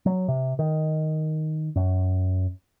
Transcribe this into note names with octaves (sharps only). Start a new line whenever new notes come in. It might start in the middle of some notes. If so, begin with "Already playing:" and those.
F#3
C3
D#3
F#2